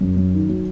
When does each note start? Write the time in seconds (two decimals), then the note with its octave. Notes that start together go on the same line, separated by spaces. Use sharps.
0.01 F#2
0.16 F#2
0.33 D#3
0.49 F#3